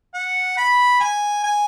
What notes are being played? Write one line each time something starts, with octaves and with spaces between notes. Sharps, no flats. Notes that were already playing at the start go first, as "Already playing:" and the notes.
F#5
B5
G#5
G#5